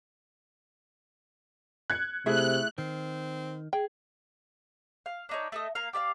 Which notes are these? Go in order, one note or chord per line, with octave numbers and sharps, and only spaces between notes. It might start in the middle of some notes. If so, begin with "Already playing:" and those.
F#6 G#6 C#7
C3 A3 E4 G#4 E5 F#6
D#3 C4 C7
G#4 G5
F5
D4 D#4 C#5
A3 A4 D#5
A#3 F5
G4 D5 E5 F5